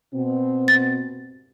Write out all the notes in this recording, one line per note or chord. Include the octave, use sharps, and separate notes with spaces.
B2 C4
A6